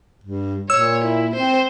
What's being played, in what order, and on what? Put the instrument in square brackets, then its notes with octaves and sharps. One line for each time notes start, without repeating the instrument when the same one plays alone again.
[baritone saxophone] G2
[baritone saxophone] A#2 [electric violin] C#5 [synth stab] E6
[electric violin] E4
[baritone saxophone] C4 [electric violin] C5